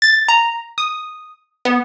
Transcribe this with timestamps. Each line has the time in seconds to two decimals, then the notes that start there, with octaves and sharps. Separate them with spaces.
0.02 A6
0.28 A#5
0.78 D#6
1.65 B3